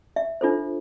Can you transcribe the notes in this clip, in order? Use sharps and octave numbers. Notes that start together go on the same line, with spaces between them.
E5
D4 F4 A4 C5